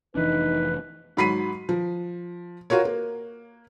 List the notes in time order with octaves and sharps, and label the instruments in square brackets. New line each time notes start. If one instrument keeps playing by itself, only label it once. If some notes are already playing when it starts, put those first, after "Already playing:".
[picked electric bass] F1 E3 D4 [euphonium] D#4 [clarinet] B4
[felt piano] G#2 F#3 B5 B6 C7 D#7
F3
F4 F#4 A#4 C#5
A#3